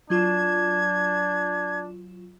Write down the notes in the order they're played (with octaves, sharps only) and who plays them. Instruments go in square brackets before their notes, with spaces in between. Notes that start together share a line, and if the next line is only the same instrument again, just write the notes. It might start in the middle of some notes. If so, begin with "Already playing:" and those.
[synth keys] F#3 F4 E7 [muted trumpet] D4 [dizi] G#6